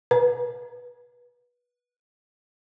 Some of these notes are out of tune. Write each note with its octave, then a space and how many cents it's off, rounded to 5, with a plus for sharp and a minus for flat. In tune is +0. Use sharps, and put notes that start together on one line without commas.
B4 -20